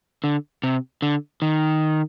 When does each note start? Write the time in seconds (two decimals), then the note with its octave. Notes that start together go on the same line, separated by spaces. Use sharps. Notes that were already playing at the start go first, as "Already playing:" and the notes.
0.24 D3
0.63 C3
1.02 D3
1.42 D#3